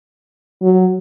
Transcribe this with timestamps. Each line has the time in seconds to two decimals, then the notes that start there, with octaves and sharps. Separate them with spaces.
0.62 F#3